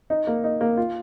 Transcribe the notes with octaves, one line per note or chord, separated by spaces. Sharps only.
D#4
A#3
D#4
A#3
F4